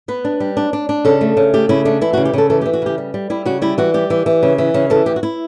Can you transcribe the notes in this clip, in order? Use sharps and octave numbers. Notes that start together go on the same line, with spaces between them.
B3 B4
D4
G3
D4
D4
D4
C#3 A4
A3
C#3
A3 G4
C#3 E4
A3 D4
E3 E4
F#4
C#3
G4
C#3 A4
E3 A4
G4
E3
F#4
C#3 G4
G3
G3
G3 E4
C#3 F#4
G3 E4
E3 F#4
G3 G4
E3
E3
C#3
E3
C#3
E3 A4
D2 G4
F#4
E4